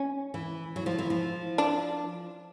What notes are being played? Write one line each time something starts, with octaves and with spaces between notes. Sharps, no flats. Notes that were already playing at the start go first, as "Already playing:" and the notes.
Already playing: C#4
E3
F#3
F3
E3
F3
D4